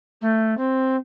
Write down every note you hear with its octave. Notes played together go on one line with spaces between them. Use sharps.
A3
C4